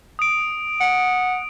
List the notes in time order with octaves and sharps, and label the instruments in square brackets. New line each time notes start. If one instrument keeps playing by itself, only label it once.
[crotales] D#6 D7
[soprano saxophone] F#5